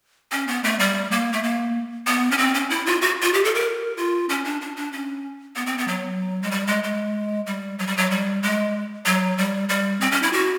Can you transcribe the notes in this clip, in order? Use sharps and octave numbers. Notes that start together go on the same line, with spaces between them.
C#4
B3
A3
G3
A#3
A3
A#3
B3
C#4
C4
C#4
E4
F4
F#4
F4
G4
A4
A#4
F4
C#4
D4
D4
D4
C#4
B3
C4
B3
F#3
G#3
G3
G#3
G#3
G3
F#3
G3
F#3
G3
G#3
F#3
G3
G3
C4
C#4
E4
F#4